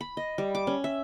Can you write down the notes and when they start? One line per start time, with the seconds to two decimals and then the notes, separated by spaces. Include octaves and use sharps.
0.01 B5
0.17 D#5
0.38 G3
0.55 D6
0.67 C#4
0.84 E5